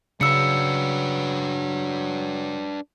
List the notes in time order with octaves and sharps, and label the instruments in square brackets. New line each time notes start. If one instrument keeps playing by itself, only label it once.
[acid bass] C#3 [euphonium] F#3 [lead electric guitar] D4 B4 [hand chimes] E6 C#7